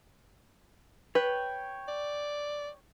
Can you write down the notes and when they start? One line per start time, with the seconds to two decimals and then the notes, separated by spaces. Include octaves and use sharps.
1.15 B4 C#5 G5
1.88 D5